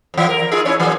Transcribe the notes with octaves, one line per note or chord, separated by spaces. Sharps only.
F2 E3
A#4
D#4 F4 G#4
C#4 E4 C#5
A#2 E3 F3